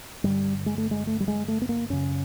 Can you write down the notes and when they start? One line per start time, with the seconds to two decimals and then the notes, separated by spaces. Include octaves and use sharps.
0.24 G2 D3 G3
0.66 G#3
0.78 A3
0.91 G#3
1.07 A3
1.20 G3
1.28 G#3
1.48 A3
1.62 B3
1.69 A#3
1.90 F#2 C#3 C#4